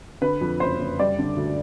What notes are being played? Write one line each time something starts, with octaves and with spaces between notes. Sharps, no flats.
D3 B4
F2
F#1 C5
F#1
G3 D5
D3
D2